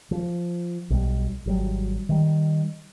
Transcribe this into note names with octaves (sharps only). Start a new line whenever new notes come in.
F3
B1 G3
G#1 F#3 G3
D#3 G3